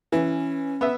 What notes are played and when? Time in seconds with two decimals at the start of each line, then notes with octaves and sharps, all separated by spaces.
0.12 E3 C#4
0.81 B3 E5